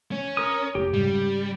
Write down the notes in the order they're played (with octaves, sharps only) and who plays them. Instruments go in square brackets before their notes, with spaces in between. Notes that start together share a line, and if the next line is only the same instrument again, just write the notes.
[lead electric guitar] C#4
[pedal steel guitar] A#4 D#6
[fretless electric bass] F1 [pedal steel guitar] G4
[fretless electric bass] G#2 C#3 [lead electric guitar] G3